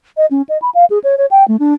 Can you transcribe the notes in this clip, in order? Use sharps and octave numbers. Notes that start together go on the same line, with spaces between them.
D#5
C#4
D#5
B5
F5
G#4
C#5
C#5
G5
A3
D4